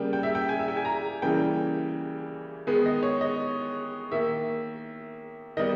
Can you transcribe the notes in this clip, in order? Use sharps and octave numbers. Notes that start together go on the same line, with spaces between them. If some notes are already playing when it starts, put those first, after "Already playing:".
Already playing: C#3 G3 A#3 G5
G5
E5
G5
G#5
E5
G5
G#5
A#5
C#3 E3 G3 A#3 G5
D#3 G#3 B3
D#5
C#5
D#5
D#3 A#3 E5
D#3 G3 B3 D#5